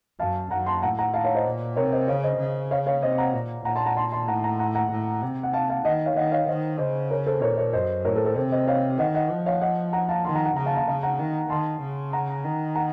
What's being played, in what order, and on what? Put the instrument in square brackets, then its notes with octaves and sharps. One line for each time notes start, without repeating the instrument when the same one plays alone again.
[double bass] F#2 [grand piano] F5 A5
[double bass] F#2 [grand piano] F#5 A#5
[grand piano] A5 C6
[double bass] A2 [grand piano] F#5 A#5
[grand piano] F#5 A#5
F5 A5
C#5 F5
C5 D#5
[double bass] A#2
[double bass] C3 [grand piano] A#4 C#5
[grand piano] C5 D#5
[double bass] C#3 [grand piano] C#5 F5
[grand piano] C5 D#5
[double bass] C#3
[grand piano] C#5 F5
C#5 F5
[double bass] C3 [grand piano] C5 D#5
[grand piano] F#5 A#5
[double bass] A#2
[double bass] A#2 [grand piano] F#5 A#5
[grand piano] A5 C6
F#5 A#5
A5 C6
A5 C6
[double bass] A2 [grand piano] F#5 A#5
[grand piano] F#5 A#5
F#5 A#5
F#5 A#5
[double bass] A2
C3
[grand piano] F#5
F5 A5
F5 A5
[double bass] D#3 [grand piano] D#5 F#5
[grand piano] C#5 F5
[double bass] D#3 [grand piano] D#5 F#5
[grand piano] C#5 F5
[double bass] D#3 [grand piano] C5 D#5
[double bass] C#3 [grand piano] C5 D#5
[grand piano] A#4 C#5
A4 C5
[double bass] A#2 [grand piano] A#4 C#5
[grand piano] A#4 C#5
[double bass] F#2 [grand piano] C5 D#5
[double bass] A2 [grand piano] A#4 C#5
[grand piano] A4 C5
A4 C5
[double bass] C3 [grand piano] A4 C5
[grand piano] C5 D#5
C#5 F5
[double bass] D#3 [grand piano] D#5 F#5
[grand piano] D#5 F#5
[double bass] F3
[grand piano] C#5 F5
D#5 F#5
F#5 A#5
F5 A5
[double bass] D#3 [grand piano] A5 C6
[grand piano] F#5 A#5
F#5 A#5
[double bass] C#3 [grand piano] F#5 A#5
[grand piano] F5 A5
F5 A5
[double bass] C#3 [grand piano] F5 A5
[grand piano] F#5 A#5
[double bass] D#3
[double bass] D#3 [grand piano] A5 C6
[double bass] C#3
[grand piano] F#5 A#5
[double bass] D#3
[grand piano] F#5 A#5